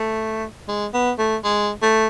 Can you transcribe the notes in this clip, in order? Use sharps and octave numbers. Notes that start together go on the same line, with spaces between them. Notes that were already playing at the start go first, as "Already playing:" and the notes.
Already playing: A3
G#3
B3
A3
G#3
A3